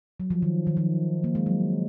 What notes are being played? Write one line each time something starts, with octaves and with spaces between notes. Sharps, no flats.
F#3
F3
D#3
D#3
F3
A#3
G#3
F#3